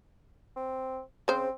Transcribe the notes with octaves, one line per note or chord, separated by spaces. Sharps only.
C4
C#3 C4 C5